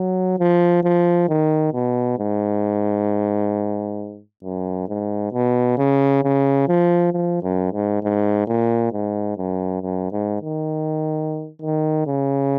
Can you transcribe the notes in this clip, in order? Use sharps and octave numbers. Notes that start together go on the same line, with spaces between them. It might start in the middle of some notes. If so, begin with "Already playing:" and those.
Already playing: F#3
F3
F3
D#3
B2
G#2
F#2
G#2
B2
C#3
C#3
F3
F3
F#2
G#2
G#2
A#2
G#2
F#2
F#2
G#2
D#3
D#3
C#3